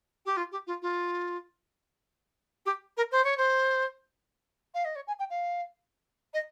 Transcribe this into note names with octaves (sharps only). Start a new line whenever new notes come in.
G4
F4
G4
F4
F4
G4
A#4
C5
C#5
C5
F5
D#5
C#5
G#5
G5
F5
D#5